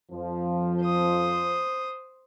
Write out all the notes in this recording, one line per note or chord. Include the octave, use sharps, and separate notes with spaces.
F2 F3
C5 D#6